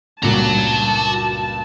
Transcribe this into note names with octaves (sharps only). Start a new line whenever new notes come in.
C#2 G2 A#2 F#4 A5 A#5